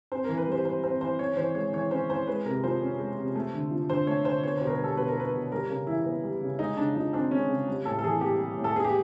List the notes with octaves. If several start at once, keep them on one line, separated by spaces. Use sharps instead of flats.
C4 C5
E3 A#4
B4
G3 C5
E3 C5
C4 C5
E3 C5
C#4 C#5
E3 C5
G#3 C#5
E3 C#5
C#4 C5
E3 C5
G#3 B4
C3 A#4
F3 C5
C#4
G#3
C3
A3
D3
F3
D3 C5
A3 C#5
D3 C5
B3 C#5
B2 C5
A#4
B4
G3 A4
B2 B4
A#4
B3 B4
B2
G3 A#4
C#3 A#4
E3 E4
B3
G3
C#3
G#3 D#4
C#3 D4
F3 D#4
C4 D4
G#3 C#4
C#3
G3
A2 A4
A4
E3 G#4
A#3 G4
G3
A2
A4
B3 G#4
G4